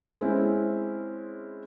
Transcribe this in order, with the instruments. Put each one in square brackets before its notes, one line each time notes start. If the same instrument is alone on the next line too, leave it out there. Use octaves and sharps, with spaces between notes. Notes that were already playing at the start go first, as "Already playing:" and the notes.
[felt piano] G#3 C4 C#4 E4